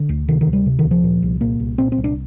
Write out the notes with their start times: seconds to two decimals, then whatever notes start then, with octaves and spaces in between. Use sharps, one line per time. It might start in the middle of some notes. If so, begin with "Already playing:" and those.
Already playing: D3
0.09 D2
0.28 C3 D#3
0.41 D#3
0.47 D2
0.53 G3
0.66 C3
0.79 D#3
0.84 D2
0.91 F3
1.03 A#2
1.23 C2
1.41 A#2 A#3
1.60 C2
1.78 A#2 C4
1.92 C4
1.98 C2
2.04 D4